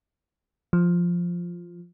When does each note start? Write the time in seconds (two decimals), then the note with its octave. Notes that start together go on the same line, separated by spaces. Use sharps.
0.73 F3